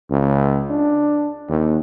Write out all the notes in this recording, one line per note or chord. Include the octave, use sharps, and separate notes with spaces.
C#2
D4
D#2